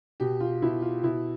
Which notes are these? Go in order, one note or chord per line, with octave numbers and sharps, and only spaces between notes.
B2 G4
F4
B2 E4
F4
B2 E4